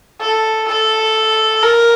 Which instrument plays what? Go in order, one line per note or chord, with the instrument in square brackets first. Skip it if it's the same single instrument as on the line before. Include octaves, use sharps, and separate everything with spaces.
[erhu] A4
A4
A#4